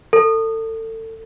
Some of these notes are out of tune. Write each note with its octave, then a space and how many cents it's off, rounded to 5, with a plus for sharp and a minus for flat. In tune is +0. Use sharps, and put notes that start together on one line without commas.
A4 +30